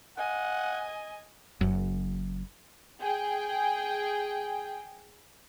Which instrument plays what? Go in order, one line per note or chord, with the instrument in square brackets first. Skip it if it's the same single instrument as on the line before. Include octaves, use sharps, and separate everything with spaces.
[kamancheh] D#5 G#5 [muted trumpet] F#5
[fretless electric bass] F#1 F#2
[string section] G#4 G5